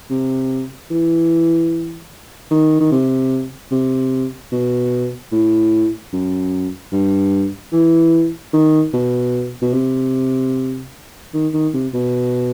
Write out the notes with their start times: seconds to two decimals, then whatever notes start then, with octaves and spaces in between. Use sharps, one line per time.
0.10 C3
0.91 E3
2.51 D#3
2.80 D#3
2.92 C3
3.72 C3
4.52 B2
5.32 A2
6.13 F#2
6.92 G2
7.72 E3
8.53 D#3
8.94 B2
9.62 B2
9.73 C3
11.34 D#3
11.54 D#3
11.74 C3
11.94 B2